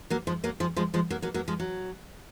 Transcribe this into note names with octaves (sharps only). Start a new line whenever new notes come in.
F#3 A#3
F3 G#3
F#3 A#3
F3 G#3
F3 G#3
F3 G#3
F#3 A#3
F#3 A#3
F#3 A#3
F3 G#3
F#3